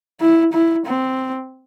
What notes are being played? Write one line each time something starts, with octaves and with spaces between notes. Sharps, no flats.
E4
E4
C4